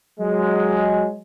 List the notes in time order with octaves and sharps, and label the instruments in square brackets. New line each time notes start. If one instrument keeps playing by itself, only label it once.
[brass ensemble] F#3 G#3